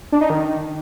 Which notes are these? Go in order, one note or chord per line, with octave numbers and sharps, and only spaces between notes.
D4
D#4
D#3